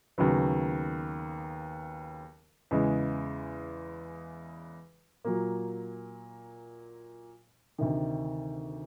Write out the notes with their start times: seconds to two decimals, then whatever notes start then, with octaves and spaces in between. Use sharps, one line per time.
0.18 D#2 C#3 F#3 B3
2.71 E2 C#3 E3 G#3
5.25 A#2 F#3 A#3
7.78 D2 C3 D#3